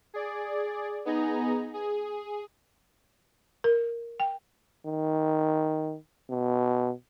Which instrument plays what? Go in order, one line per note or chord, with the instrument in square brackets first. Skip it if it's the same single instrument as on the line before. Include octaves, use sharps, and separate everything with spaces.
[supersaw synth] G#4 D5
B3 D#4 G#4 A#5
G#4
[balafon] A#4
G5
[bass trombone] D#3
B2